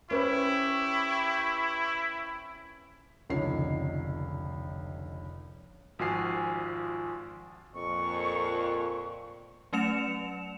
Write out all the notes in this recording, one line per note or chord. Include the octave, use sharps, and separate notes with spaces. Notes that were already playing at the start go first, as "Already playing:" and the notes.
C#4 E4 G4 B4 C5 C#6
F1 C#2 D3 D#4 C#5 C7
G#1 F3 F4 F#4 G#5 C7
F2 A#2 C#6
F#3 A3 C#4 C#7 E7 F7